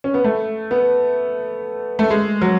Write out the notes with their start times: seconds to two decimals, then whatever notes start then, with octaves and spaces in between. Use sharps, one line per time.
0.04 C#4
0.14 B3
0.24 A3
0.71 B3
1.99 A3
2.11 G#3
2.42 F#3